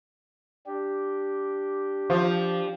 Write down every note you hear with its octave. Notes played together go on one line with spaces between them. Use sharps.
D4 G4
F3